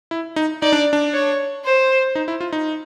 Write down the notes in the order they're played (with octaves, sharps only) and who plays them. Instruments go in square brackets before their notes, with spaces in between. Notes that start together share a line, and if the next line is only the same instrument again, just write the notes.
[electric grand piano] E4
D#4
[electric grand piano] D#4 [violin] D5
[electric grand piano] D4
D4
[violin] C#5
C5
[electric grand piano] D#4
E4
F4
D#4